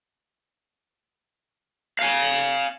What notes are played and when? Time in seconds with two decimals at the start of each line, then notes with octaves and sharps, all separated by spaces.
1.99 F5 G#5